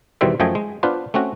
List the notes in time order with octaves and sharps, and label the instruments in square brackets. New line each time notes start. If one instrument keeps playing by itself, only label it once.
[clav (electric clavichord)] E2 B2 D#3 G3 C5 E5
F#2 F3 A3 D#5 G5 G#5
G#3
B3 D4 F4 B4 C5
A3 C4 C#4 F#4